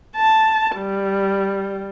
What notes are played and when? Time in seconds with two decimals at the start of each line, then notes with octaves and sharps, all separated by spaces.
0.17 A5
0.77 G3